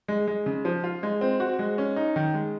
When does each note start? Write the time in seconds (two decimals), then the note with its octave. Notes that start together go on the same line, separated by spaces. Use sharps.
0.08 G#3
0.27 G#3
0.46 C#3
0.65 F3
0.84 F4
1.03 G#3
1.21 C4
1.40 F#4
1.59 G#3
1.78 C#4
1.96 D#4
2.16 D#3
2.34 G#3